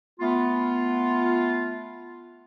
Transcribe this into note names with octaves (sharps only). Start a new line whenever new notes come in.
A3 B3 F4